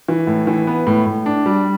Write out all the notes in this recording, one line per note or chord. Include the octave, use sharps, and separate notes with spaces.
E3
A2
E3
B3
A2
A2
D4
G3